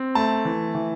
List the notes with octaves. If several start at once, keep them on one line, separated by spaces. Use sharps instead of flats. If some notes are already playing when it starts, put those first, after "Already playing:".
Already playing: C4
A3 A5
E3
E3